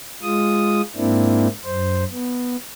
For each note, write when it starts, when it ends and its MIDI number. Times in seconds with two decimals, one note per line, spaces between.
0.22 0.81 56
0.22 0.81 65
0.22 0.81 87
0.96 1.47 44
0.96 1.47 58
0.96 1.47 60
0.96 1.47 62
0.96 1.47 64
1.65 2.04 42
1.65 2.04 72
2.11 2.57 59